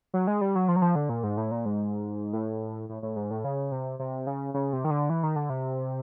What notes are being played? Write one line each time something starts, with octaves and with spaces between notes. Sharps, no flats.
F#3
G#3
G3
F#3
F3
F#3
F3
D3
A#2
G#2
A2
A#2
G#2
A2
A2
A2
G#2
A2
C#3
C3
C3
C#3
C#3
C3
D#3
D3
E3
D#3
D3
C3